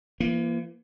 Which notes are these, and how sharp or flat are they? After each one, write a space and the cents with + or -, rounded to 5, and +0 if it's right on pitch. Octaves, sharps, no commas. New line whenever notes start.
E3 +45 A#3 +15